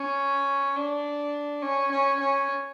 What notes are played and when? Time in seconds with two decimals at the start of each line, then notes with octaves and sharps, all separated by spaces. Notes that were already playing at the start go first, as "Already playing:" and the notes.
Already playing: C#4
0.76 D4
1.62 C#4
1.91 C#4
2.20 C#4